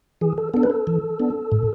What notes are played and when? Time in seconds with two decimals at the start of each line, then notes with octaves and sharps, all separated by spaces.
0.21 E3 G#4
0.38 A4
0.54 B3 D4 A4
0.63 B4
0.70 A4
0.87 E3
1.20 B3 D4
1.52 A2